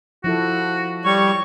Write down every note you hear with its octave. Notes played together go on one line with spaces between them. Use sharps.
F3 E4 F#4 A4
G3 C#5 C#6